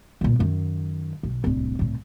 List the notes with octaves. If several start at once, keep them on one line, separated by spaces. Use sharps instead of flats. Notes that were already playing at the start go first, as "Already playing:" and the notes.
C#2 A#2
F#2 D#3
B1
D1 C2
C2 A2